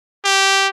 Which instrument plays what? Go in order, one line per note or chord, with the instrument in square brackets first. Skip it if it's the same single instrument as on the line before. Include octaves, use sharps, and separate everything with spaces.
[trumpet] G4